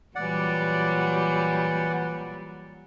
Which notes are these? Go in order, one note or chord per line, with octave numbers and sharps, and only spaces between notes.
A#2 E3 F#3 G3 D5 F#5